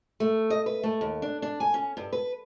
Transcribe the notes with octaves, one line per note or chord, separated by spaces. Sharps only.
A3
D#5
B4
A3
D#2
D4
D4
G#5
C#4
G2
B4